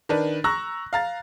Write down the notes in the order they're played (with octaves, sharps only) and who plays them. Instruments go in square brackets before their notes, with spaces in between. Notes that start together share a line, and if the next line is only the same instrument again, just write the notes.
[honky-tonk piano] D#3 D4 B4
A#5 C#6 E6 F#6 A#6
F5 A#5 A6